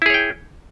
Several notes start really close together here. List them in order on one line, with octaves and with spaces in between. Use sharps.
E4 G#4 C#5 G5